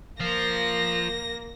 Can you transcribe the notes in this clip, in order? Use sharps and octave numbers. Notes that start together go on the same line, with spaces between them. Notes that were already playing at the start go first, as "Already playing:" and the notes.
F3 A#3 F4 A#6